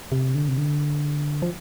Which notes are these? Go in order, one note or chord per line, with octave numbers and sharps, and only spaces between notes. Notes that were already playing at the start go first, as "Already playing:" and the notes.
C3
D3
C3
D3
F3